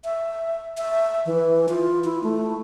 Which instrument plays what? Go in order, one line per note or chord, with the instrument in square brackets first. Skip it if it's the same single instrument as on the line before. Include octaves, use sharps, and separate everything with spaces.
[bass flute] E5
E5
E3
F4
E4
A3